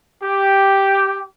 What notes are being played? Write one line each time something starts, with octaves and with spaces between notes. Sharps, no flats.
G4